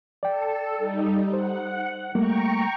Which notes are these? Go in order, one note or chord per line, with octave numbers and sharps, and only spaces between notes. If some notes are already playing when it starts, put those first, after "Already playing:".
A4 D5 G5
G3 D#4
C5 F#5
G3 A3 A#3 G5 A#5 C#6